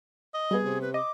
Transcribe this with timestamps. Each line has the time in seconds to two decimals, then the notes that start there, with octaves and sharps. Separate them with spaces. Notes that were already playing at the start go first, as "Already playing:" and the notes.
0.34 D#5
0.51 G3 B3 G#4
0.64 C3
0.82 B4
0.94 D#5 D6